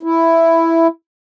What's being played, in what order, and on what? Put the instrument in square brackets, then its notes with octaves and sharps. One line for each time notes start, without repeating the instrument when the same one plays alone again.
[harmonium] E4